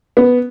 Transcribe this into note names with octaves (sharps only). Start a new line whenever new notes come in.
B3